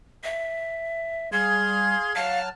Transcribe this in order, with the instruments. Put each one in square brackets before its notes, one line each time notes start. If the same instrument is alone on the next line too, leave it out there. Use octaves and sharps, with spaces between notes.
[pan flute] E5
[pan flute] G3 [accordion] G#4 F5 C6 [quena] G#6
[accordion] F#3 A5 F6 [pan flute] F5